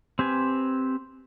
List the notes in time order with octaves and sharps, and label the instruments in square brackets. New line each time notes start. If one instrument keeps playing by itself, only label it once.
[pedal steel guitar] C4 G4 B4 G#5